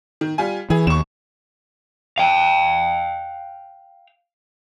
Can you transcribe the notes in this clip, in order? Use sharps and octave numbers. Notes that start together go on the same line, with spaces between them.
D#3
G3 F4 G#5
E3 G#4
D#2 C#6 E7
F5 G5